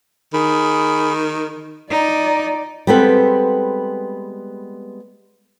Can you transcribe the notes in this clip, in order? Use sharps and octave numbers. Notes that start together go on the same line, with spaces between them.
D#3 G#4 B5
D#4 D5
G3 G#3 B3 C4 A4 B4